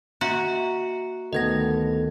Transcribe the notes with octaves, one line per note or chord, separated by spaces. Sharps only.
A#3 F#4 E5 A#5
D2 D#3 B3 A4 D#5 G#6 A#6